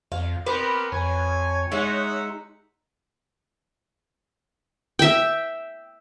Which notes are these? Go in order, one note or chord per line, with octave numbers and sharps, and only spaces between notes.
F2 F5
B3 C4 G4 A#4 B4
F2 C#5 G#5
G#3 D#4 E5 F#5
E5 G5